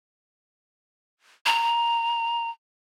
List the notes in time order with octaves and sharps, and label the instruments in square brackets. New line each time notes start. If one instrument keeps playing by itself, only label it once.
[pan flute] A#5